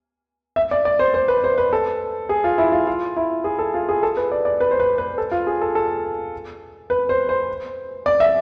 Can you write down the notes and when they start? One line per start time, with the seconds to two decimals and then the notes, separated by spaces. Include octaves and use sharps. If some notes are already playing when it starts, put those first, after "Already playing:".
0.56 E5
0.71 D5
0.85 D5
0.99 C5
1.14 C5
1.28 B4
1.44 C5
1.58 B4
1.73 A4
2.29 G#4
2.44 F4
2.58 E4
2.72 F4
2.87 F4
3.17 E4
3.44 G#4
3.59 A4
3.74 F4
3.89 G#4
4.03 A4
4.17 B4
4.32 D5
4.45 D5
4.60 B4
4.71 C5
4.80 B4
4.98 B4
5.18 A4
5.31 F4
5.47 G#4
5.61 A4
5.75 A4
6.90 B4
7.09 C5
7.29 C5
8.06 D5
8.20 E5